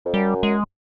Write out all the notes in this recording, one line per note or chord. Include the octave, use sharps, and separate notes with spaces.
F2
F#2 G3
G#3